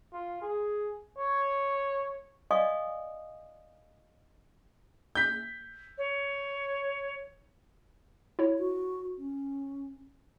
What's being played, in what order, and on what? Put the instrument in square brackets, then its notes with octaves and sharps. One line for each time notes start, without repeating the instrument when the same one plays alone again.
[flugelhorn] F4
G#4
C#5
[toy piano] D5 D#5 F5 G#5 C#6 D#6
[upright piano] G6 B6
[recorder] C#5
[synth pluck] E4 C#5
[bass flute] F#4
C#4